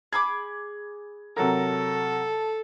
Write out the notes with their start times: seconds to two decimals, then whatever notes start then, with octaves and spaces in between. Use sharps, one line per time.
0.13 G#4 B5 D6 G#6
1.37 C3 F#3 A4 A#4